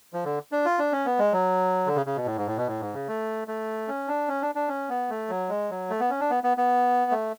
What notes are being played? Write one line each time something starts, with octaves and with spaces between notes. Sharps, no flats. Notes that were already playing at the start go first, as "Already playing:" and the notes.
F3
D3
D4
F4
D4
C#4
B3
G#3
F#3
D3
C#3
C#3
B2
A2
G#2
A2
B2
A2
G#2
C#3
A3
A3
C#4
D4
C#4
D4
D4
C#4
B3
A3
F#3
G#3
F#3
A3
B3
C#4
D4
B3
B3
B3
A3